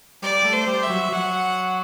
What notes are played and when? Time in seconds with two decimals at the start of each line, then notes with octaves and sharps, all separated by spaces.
0.22 G3 D5
0.45 A3
0.52 C5
0.67 G3
0.83 E5
0.90 F#3
1.12 F#3 F#5